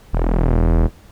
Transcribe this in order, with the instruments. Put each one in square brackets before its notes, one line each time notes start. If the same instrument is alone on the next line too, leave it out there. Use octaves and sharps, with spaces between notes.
[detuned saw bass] E1